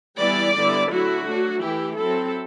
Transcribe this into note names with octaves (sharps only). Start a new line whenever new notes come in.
E3 G3 B3 E4 D5
D3 G3 B3 E4
D3 F#3 A3 E4 F#4
F#3 A3 D4
E3 A3 E4 G4
F#3 C4 E4 A4